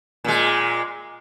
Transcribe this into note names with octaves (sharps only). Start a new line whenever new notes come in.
A#2 G#3